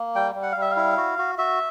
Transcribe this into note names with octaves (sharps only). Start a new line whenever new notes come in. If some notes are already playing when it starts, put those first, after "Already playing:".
Already playing: A#3
G3 G5
G3
F#5
F5
G3
E5
F5
E4
F#4
F#4
F#4 E5